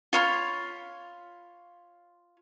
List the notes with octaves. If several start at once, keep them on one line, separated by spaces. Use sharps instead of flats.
F4 C#5 B5